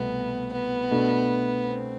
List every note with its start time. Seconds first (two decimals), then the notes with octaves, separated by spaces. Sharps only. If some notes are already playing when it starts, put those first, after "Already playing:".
Already playing: C2 B2 A3 B3
0.53 B3
0.91 B2 A3 D4
1.66 C4